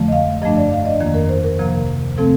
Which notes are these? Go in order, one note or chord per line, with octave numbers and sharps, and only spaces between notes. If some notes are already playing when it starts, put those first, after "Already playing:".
Already playing: F2 D3 F3 A3
D#5
F5
G2 F3 A3 D4 D#5
D5
F5
D#5
F2 D#3 A#3
A#4
C5
A#4
D2 C3 F3 A#3
C3 F3 A3 C4 A4